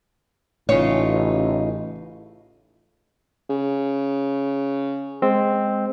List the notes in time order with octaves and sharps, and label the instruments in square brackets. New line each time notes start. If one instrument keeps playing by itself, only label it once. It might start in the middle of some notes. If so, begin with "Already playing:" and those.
[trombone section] A1 [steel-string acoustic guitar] C#3 D#4 F4 [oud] C#5
[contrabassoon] C#3
[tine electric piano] G#3 C4